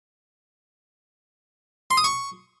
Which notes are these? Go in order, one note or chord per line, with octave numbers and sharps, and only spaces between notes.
C6
D#6
C#6